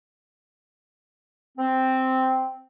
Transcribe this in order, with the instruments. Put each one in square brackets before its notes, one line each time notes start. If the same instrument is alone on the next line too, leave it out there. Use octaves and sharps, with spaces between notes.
[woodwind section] C4